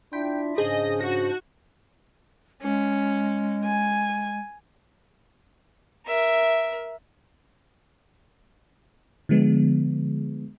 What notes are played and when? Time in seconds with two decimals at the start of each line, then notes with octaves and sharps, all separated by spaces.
0.13 D4 E4 F4 E5 G5
0.58 G#2 C#3 D4 G#4 C5 D#5
1.01 F#4 A#6
2.63 G#3 C#4
3.65 G#5
6.07 A#4 E5
9.29 D3 F3 G#3 B3